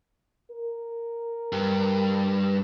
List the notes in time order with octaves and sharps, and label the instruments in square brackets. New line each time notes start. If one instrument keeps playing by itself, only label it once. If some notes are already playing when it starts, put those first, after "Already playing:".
[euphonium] A#4
[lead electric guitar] G2